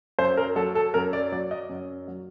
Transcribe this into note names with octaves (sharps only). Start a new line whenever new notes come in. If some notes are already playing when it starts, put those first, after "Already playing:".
F#2 C5
A#4
F#3 A4
A4
F#2 A#4
D5
F#3 D5
D#5
F#2
F#3